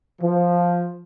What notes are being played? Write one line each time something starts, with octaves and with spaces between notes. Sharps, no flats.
F3